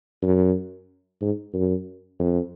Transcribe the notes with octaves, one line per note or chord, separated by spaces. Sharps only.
F#2
G#2
F#2
F2